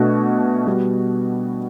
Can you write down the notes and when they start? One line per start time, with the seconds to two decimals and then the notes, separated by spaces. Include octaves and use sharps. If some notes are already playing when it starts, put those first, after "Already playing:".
Already playing: B2 A3 D4 F#4
0.67 G3 B3 F#4